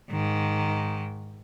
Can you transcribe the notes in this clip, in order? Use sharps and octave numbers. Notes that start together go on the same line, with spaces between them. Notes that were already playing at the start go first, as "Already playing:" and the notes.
G#2 D#3